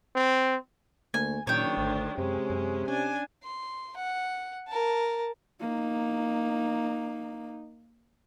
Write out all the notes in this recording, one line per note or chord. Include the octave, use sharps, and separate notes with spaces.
C4
D2 A#3 G#5
F#1 A#2 D#3 D4 C#5 G5
G#1 D2
F#2 C3 G#3 C#4
F#2
C#4 D4 G#5
C6
F#5
A#4 A5
A#3 D#4